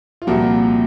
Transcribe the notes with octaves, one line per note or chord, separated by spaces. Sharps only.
F4
C2 A#2 F3 A#3 F#4